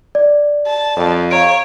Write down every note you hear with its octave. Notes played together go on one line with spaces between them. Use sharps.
D5
A5
F2
C#5 F5 A#5 D7